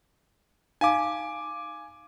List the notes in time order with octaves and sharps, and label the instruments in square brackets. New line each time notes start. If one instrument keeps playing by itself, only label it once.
[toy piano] D#4 F5 B5 [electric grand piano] G#5 D6